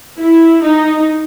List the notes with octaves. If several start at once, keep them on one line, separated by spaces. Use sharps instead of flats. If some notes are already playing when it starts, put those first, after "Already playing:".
E4
D#4